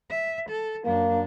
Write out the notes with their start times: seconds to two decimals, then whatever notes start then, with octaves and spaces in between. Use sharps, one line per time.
0.10 E5
0.50 A4
0.85 F#2 A#3 D4